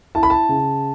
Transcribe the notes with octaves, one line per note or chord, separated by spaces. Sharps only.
E4 A5
B5
A5
C#3